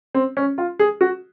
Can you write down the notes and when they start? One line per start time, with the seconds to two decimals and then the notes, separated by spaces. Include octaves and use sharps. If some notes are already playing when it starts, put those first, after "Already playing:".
0.14 C4
0.37 C#4
0.58 F4
0.79 G#4
1.01 F#4